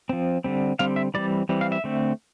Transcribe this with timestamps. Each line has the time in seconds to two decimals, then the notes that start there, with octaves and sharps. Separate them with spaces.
0.09 F3 C4
0.44 D3 G3 C4
0.79 D3 G3 C4 F5
0.96 E5
1.14 E3 G3 C4 D5
1.49 E3 G3 C4
1.61 F5
1.72 E5
1.84 D3 A3 C4